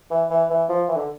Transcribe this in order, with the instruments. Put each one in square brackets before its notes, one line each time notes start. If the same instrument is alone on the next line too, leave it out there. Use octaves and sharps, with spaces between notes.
[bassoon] E3
E3
E3
F3
E3
D3